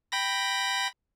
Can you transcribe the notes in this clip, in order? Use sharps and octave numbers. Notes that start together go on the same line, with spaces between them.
G5 B5 A#6